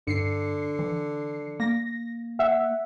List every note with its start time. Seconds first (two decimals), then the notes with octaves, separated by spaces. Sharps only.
0.07 G2 D3 C7 C#7
0.79 E3
1.60 A#3 A#6
2.39 E5 F#5